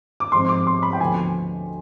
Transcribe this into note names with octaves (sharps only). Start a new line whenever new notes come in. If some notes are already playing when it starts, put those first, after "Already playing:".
D6
G#2 F3 G#3 C4 C6
D6
C6
B5
G5
D2 D3 F3 B3 G#5